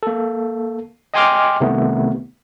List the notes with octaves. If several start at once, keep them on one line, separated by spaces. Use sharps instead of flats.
A#3 A4
D#5 G5 G#5 C6 D6 F6
C2 C3 D#3 A3 B3